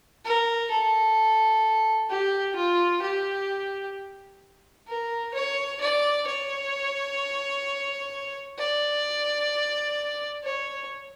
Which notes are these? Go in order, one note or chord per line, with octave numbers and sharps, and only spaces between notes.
A#4
A4
G4
F4
G4
A#4
C#5
D5
C#5
D5
C#5